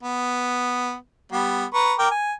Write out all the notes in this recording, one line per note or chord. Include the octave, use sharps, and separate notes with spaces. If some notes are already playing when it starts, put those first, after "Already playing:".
B3
G3 B3
B4 A#5 C#6
A#4 G5 D6
G#5